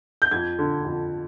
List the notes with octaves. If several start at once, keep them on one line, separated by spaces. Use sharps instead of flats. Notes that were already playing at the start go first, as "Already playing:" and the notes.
G6
F2 G#6
D3
F2